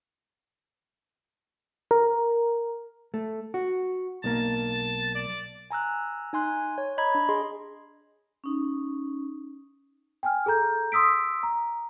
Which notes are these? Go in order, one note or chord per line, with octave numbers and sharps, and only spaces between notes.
A#4
A3
F#4
B1 A#3 A5
D5
G#5 A#5 E6 F#6
D#4 G#5 C6 F#6
C#5
D#5 A#5 B5 G#6
D4
G#4 D#5 C6
C#4 D#4
G5 G#5 F6
G#4 A4 A#5 G6
C6 D#6 E6 B6 D7
A#5